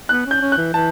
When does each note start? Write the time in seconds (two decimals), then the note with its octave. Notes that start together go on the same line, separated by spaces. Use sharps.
0.09 B3 F#6
0.26 C#4 G6
0.42 C#4
0.52 F#6
0.57 E3
0.74 E3 A5